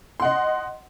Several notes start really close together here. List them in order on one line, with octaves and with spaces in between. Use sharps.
C6 F#5 D#5